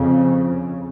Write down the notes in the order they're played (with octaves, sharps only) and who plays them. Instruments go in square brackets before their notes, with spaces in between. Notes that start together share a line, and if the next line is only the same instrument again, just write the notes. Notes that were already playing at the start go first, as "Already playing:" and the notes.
Already playing: [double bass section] F2 C#3